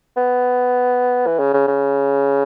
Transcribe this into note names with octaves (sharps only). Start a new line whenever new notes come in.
B3
E3
C#3
C#3
C#3